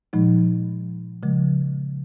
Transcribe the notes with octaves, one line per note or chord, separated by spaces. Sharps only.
A#2 F3 G#3 D#4
C#3 F3 G#3